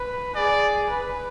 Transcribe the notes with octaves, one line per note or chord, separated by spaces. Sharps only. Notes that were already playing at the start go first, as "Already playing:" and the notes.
Already playing: B4
G#4 D5
B4